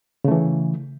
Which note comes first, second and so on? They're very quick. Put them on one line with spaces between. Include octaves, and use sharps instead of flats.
C#3 A3 E3